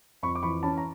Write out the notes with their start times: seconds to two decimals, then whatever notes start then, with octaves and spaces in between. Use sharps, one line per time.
0.23 F2 B5 C#6
0.35 D6
0.43 E3 B5 C#6
0.63 C#4 A5 B5
0.77 A#5